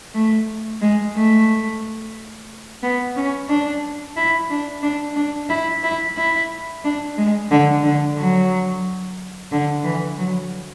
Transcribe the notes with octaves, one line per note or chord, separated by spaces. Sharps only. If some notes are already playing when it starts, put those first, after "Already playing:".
A3
G#3
A3
B3
C#4
D4
E4
D4
D4
D4
E4
E4
E4
D4
G#3
D3
D3
F#3
D3
E3
F#3